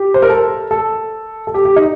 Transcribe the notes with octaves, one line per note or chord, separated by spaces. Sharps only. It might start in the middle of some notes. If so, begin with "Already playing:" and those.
Already playing: G4
C5
A#4
A4
A4
A4
G4
G4
D#4